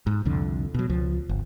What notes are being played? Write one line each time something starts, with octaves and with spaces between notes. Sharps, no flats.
G#2
C2 F2 D3
B2 F#3
C#2 F3
G1